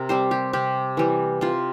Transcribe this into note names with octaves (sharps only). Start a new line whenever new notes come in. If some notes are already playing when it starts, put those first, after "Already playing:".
Already playing: C3 A#4
G3 C4 C5
G4
C3 G4
E3 G3
C3 F4